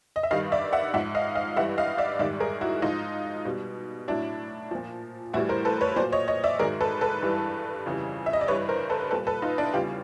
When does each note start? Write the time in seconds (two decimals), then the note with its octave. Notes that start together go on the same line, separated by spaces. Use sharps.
0.16 D#5
0.23 E5
0.31 G2 D#3 G3 D#5 F5
0.52 D5 E5
0.73 E5 F#5
0.94 G#2 F3 E5 F#5
1.15 D#5 F5
1.35 D#5 F5
1.56 G2 E3 G3 E5 F#5
1.78 D#5 F5
1.98 D5 E5
2.19 G#2 D#3 G3 D5 E5
2.40 G#4 A#4
2.61 E4 F#4
2.82 G#2 F3 D#4 F4
3.45 B2 G3
4.08 A2 F#3 D4 E4
4.71 A#2 F3
5.33 A2 E3 G3 E4 F#4
5.49 A#4 C5
5.65 A4 B4
5.81 B4 C#5
5.96 A#2 C5 D5
5.99 F#3
6.12 C#5 D#5
6.28 C#5 D#5
6.44 D5 E5
6.59 G#2 D#3 F#3 G#4 A#4
6.81 A4 B4
7.01 A4 B4
7.22 G2 E3 G3
7.86 F2 C#3 E3 G3
8.26 E5
8.33 D#5
8.41 D5
8.48 G2 E3 G3 B4 C#5
8.69 A#4 C5
8.90 A4 B4
9.11 A#2 G3 A4 B4
9.27 A4 B4
9.42 D#4 F4
9.58 D4 E4
9.73 E2 C#3 E3 G3 F4 G4